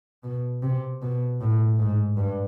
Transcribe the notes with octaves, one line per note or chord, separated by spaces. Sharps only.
B2
C3
B2
A2
G#2
G2